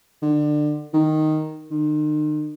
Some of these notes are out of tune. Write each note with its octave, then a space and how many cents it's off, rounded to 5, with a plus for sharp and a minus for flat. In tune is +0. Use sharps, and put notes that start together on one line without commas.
D3 +25
D#3 -5
D#3 -40